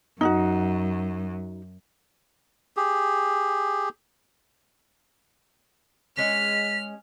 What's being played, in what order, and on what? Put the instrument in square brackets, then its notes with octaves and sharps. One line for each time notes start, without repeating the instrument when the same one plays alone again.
[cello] F#2 [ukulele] D#4 F4 F#4
[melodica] G4 G#4
[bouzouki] G#3 C#4 [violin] F6 [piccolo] B6